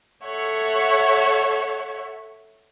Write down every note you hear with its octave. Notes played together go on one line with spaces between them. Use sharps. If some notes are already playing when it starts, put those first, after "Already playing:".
A4 C#5 E5 F#5